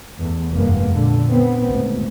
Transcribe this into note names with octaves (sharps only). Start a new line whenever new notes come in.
E2 A3
F1 G2 G#3 A#3 B3
A#2 D3
B3 C4
G#1 D2